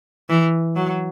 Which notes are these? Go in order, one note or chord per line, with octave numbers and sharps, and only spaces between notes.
E3
F#3